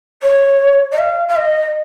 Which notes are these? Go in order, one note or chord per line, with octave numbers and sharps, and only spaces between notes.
C#5
D#5
F5
F5
D#5